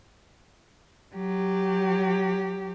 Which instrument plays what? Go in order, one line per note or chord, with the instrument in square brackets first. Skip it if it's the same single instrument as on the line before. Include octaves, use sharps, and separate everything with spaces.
[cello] F#3 G4